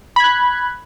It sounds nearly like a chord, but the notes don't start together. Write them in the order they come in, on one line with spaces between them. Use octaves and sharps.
B5 G#6 F#6